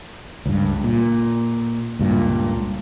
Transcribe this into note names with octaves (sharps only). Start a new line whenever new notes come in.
C#2 G2
A#2
C#2 G2 A#2